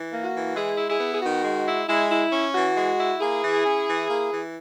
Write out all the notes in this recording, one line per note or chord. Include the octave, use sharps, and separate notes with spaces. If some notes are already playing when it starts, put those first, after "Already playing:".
Already playing: E3
A#3
F#4
E3
G#3 E4 G#4
E4
E4 G#4
B3
G#4
D#3 F#4
G#3
E4
G#3 E4
E4
C#4
E3 F#4
G#3
E4
A#3 E4 G#4
E3
C#4
E3
A#3
E3